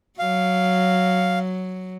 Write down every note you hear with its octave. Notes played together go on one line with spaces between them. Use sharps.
F#3 F5